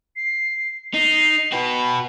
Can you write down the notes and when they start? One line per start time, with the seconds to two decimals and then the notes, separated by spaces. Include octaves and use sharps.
0.16 C7
0.94 D#4 C7
1.52 F#4 B4 G5